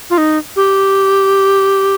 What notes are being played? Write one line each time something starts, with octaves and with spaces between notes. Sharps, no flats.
F4
D#4
G4